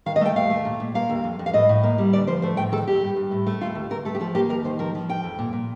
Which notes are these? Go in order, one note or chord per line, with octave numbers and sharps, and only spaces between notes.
D#3 F5
D#5
A3 G5
D#2 F5
A3
A#2
A#2
A#3 F5
D#2
F2
F2
F5
A2 D#5
A2
A#3
G3
D2 D5
F3 C5
A3 C5
A2 G5
D#3 A4
D#2 G4
G2
G2
A2
A3
D#2 F4
D#2
D2 A#4
A3 A4
G4
F3 A4
A#3 G4
D#2 A#4
D#3 C5
F3 A#4
F3
F2 G5
F2
A#2
A#2